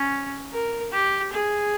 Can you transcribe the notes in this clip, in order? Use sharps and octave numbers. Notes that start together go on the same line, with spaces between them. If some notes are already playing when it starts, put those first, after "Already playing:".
Already playing: C#4
A#4
G4
G#4